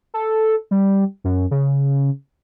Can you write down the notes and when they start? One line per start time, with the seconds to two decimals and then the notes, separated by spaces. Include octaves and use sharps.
0.14 A4
0.71 G3
1.24 F#2
1.51 C#3